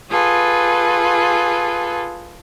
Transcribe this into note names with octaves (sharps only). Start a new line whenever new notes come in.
F4 G#4 A4 B4